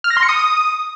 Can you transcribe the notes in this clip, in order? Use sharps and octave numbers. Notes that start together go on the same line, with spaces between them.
F6
A#6
C6
C#7
D#6